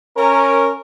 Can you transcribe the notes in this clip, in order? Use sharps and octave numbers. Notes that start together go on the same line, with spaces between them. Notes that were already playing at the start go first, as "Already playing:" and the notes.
C#4 A#4